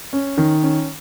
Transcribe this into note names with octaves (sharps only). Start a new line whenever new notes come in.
C#4
D#3
C#4